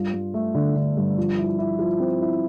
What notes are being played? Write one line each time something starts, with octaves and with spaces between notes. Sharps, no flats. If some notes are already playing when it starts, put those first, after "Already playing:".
Already playing: G2 F4
G2
A3
D3
D3
G2
F3
E4
E4
F3
C4
E4